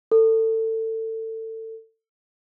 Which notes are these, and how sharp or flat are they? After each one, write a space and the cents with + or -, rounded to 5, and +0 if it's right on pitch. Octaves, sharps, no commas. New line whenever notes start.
A4 +25